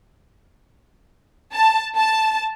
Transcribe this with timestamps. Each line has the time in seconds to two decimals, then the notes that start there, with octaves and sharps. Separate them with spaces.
1.52 A5
1.95 A5